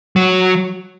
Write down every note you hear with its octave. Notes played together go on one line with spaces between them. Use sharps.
F#3